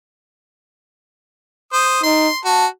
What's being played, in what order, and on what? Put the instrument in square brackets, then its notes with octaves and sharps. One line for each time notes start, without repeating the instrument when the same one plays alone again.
[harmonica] C5 D#6
[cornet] D#4 [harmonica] C6
[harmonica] F#4 [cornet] A5